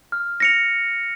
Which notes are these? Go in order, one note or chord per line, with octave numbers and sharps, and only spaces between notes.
F6
A#6 C#7 F7